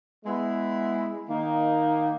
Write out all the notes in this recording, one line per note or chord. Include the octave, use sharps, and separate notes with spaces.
G#3 B3 E4
D#3 A#3 D#4